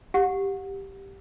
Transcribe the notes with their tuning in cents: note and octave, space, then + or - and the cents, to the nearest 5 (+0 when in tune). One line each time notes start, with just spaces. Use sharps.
G4 +0 F#5 -30